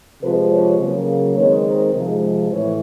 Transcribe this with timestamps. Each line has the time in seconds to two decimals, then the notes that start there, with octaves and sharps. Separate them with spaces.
0.22 C3 F3 G#3 A4 B4
0.51 B4 C#5
0.79 C#3 F#3 A#3
1.37 D#3 G#3 C4 D#4 B4 C#5
1.65 A#4 C5
1.94 C3 F3 G#3
2.51 A2 E3 B4 C#5